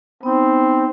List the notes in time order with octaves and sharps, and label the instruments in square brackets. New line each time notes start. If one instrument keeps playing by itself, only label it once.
[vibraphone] B3 D#4 [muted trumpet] C4